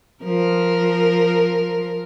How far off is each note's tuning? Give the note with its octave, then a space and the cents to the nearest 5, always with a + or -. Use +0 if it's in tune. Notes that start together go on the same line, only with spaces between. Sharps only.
F3 +0 A#4 +0